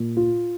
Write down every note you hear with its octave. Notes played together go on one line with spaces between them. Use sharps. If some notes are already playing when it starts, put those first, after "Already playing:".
Already playing: A#2
F4